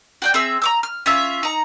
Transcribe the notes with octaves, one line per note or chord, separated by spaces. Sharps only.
F#4 D5 G5
C4 G#4 E5 E6
A#5 D6 E6
F6
C#4 F4 E5 E6
D#4 A#5